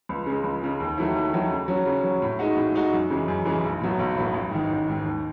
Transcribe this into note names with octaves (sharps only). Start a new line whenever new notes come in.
C#2
C#3 G#3
C#2
C#3 G#3
D#2
D#3 F#3 A3 E4
D#2
D#3 F#3 A3 E4
C#3
F#3 C#4
C#3
F#3 C#4
A2
G#3 D#4 F#4
A2
G#3 D#4 F#4
F#2
C#3 E3 G#3
F#2
C#3 E3 G#3
B1
A2 F#3 B3
B1
A2 F#3 B3
A1
G#2 D#3
A1
G#2 D#3
D#2